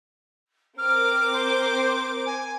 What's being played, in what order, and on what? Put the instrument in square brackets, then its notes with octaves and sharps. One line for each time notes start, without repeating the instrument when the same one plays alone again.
[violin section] C4 A#4 D6 [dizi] F6
[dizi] C5
G#5